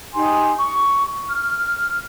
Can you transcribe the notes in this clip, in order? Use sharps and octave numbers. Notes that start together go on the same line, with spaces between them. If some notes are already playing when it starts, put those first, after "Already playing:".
D#4 G4 G#5 C6
C#6
F6